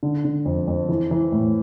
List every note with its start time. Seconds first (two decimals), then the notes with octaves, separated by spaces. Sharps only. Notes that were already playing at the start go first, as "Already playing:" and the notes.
0.03 D3
0.25 D3
0.45 F2
0.67 F2
0.89 E3
1.11 E3
1.32 A2